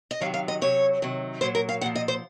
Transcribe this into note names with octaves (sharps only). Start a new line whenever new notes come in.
D#5
C3 D#3 F#3 F5
F5
D#5
C3 F#3 C#5
C3 D#3 F#3
A#2 F#3 C5
A#4
F5
A#2 F3 F#5
D#5
C5